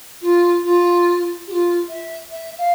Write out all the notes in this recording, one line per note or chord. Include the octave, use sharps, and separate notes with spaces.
F4
F4
G4
F4
E5
E5
F5